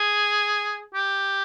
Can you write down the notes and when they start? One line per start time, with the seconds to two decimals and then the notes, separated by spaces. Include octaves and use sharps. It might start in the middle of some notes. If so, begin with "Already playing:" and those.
Already playing: G#4
0.95 G4